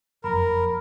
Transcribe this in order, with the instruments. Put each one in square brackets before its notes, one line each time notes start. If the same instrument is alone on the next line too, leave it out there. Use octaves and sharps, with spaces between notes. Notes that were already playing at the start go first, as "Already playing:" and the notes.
[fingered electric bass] F#1 F2 [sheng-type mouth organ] A#4 [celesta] B5